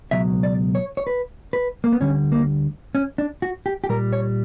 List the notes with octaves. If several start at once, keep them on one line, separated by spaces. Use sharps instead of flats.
C#2 B2 F#3 E5
D5
C#5
C#5
B4
B4
A#3
B3
D2 D3 G3 C#4
A#3
C#4
D4
F#4
G4
G4
A#2 G3 A#4
C#5